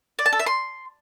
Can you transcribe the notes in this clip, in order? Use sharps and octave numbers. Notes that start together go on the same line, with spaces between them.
D5
A5
A4
E5
C6